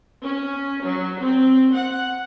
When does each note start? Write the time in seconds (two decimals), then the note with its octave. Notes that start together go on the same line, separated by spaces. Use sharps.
0.23 C#4
0.83 F#3
1.20 C4
1.75 F#5